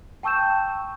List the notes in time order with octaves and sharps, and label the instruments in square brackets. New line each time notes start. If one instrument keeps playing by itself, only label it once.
[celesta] G5 A5 C#6 E6 G6 E7